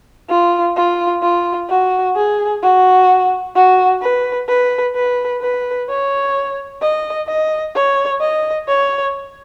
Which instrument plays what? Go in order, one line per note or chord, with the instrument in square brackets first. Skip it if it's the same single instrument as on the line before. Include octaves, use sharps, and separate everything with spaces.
[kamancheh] F4
F4
F4
F#4
G#4
F#4
F#4
B4
B4
B4
B4
C#5
D#5
D#5
C#5
D#5
C#5